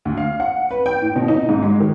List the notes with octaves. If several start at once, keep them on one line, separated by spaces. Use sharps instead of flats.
D2
F5
F#5
B4
G5
A2
B2
D#4
G#2
G#3
D#3